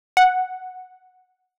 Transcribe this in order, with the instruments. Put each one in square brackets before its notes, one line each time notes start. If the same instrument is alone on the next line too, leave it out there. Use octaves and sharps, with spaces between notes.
[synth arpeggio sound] F#5